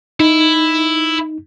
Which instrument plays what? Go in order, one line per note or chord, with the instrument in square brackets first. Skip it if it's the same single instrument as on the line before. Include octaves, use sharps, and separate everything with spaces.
[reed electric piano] D#4 [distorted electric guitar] E4